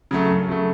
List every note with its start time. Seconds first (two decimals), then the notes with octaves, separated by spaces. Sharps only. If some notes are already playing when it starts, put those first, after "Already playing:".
0.11 C#3 F#3 A3
0.30 F#2
0.49 C#3 F#3 A3